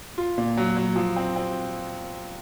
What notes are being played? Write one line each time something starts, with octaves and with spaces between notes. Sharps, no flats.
F4
A#2
F#3
F#3
F3
C4
C4